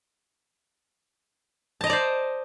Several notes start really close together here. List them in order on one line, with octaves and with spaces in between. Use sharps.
A5 D#5 A#5 D5 C5